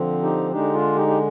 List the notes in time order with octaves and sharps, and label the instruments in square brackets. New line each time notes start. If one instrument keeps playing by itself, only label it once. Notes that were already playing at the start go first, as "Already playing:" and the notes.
Already playing: [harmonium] D3 F3 C4
D#4 G4
D3 G#3 D4 D#4 G4
D4 F4
D#4 G4
G4